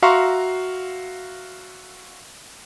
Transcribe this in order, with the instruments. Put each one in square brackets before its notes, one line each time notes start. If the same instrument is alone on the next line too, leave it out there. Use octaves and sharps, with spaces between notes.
[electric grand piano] F#4 E5 F5 A#5 C6 C#6